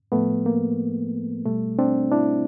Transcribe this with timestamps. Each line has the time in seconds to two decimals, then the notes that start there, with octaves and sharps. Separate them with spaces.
0.12 A2 F3 A3 B3
0.46 A#3
1.45 B2 G3 A3
1.79 C4 D4
2.11 D4 E4